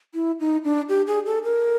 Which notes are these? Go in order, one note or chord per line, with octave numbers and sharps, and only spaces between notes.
E4
D#4
D4
G4
G#4
A4
A#4